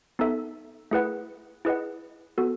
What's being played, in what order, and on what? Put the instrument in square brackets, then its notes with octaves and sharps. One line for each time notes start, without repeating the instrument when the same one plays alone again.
[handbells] B3 D#4 A4 E5
A3 E4 G#4 B4 F#5
E4 G#4 B4 D#5 F#5
B3 F#4 A4